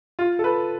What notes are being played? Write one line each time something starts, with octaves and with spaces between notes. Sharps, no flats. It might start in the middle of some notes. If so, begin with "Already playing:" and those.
F4
A4
B4